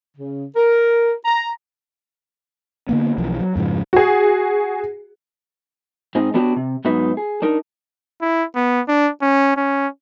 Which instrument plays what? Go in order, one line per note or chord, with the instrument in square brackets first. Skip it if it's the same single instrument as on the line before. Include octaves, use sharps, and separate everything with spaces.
[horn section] C#3
A#4
A#5
[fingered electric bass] D3 A#3 B3
B1 E3 F3
F#3
F2 G#2 C#3 F3
[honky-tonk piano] F#4 G#4
[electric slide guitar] G#2 C4 D#4 G#4
A3 B3 D4 F#4 G4 C#5
C3
G#2 F#3 B3 D#4 B4 E5
G#4
D4 D#4 A#4
[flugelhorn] E4
B3
D4
C#4
C#4